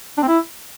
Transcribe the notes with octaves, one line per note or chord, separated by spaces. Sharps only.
D4
C4
E4